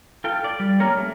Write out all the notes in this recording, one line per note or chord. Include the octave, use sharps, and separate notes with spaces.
F4 A4 G5
D5
G3
G3 A#3 C#4 A#4 C#5
A3